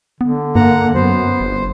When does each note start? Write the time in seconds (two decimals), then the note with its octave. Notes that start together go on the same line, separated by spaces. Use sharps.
0.21 D3 B3
0.55 G2 A#3 F#5 A#5
0.95 F#2 B3 C5
1.40 G1